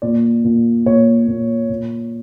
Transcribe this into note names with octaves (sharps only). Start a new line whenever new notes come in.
A#2 D5
A#2
A#2 C#5
A#2
A#2